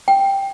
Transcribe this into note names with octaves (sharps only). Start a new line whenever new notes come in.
G5